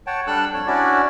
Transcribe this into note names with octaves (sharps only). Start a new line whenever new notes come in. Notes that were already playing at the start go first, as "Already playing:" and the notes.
C#5 F#5 G5 A5
G3 D4 A4 E6 F#6
F2 C#5
C#4 D4 E4 F#4 D5